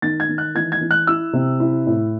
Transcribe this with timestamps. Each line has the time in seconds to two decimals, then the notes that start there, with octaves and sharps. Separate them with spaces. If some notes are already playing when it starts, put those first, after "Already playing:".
0.02 D#3 A6
0.20 G#6
0.29 D#3
0.38 F#6
0.55 E3 G#6
0.72 G#6
0.81 E3
0.91 F#6
1.07 E4 E6
1.33 C3
1.60 E4
1.86 A2